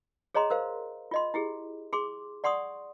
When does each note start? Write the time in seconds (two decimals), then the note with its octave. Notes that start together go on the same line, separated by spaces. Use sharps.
0.35 G#4 C#5 D#5 A#5 C6
0.50 A#4 C5 F5
1.11 F4 D#5 C6
1.34 E4 G4 G#4
1.93 G#4 C6 D6
2.44 D5 F#5 C6 C#6 D#6